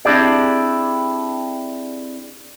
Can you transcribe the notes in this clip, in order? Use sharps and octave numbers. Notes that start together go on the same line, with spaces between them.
C4 D4 E4 G4 G#4 D5